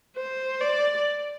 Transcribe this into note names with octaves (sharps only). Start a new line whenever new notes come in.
C5
D5